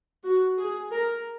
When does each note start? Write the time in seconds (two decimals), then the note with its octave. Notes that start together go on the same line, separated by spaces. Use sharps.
0.24 F#4
0.58 G#4
0.91 A#4